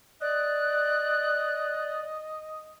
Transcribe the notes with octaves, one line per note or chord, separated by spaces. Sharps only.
D5 D#5 F#6